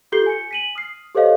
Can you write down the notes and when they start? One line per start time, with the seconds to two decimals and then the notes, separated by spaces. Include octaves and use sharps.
0.12 F4 G4 A4 G6 C7 G7
0.26 G#5 C#7
0.51 B6 D#7 F#7
0.75 D#6 F6 C7
1.15 G4 A4 C5 C#5 D#5 F5